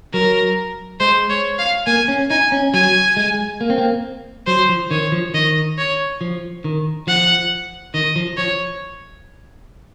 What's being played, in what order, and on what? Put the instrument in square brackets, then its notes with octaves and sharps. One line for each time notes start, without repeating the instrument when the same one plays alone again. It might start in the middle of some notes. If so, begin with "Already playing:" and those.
[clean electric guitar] F#3 [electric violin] A#4
[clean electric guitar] G#3 [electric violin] C5
[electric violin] C#5
F5
[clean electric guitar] A#3 [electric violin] G#5
[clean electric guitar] C#4
[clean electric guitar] D#4 [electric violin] G#5
[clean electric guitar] C#4
[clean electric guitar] F#3 [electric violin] G#5
[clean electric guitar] G#3
A#3
C4
A#3
[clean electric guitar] F#3 [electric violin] C5
[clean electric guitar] F3
[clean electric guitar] D#3 [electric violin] C#5
[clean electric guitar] F3
[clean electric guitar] D#3 [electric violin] D#5
[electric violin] C#5
[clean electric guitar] F3
D#3
[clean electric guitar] F3 [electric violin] F#5
[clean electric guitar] D#3 [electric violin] D#5
[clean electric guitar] F3
[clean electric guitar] F3 [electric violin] C#5